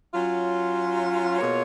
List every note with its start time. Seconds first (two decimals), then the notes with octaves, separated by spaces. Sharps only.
0.13 F#3 C#4 F4
1.39 B2 A#3 F4 G#4 C#5